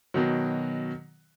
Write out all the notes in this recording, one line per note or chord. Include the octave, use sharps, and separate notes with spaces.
B2 D#3 F#3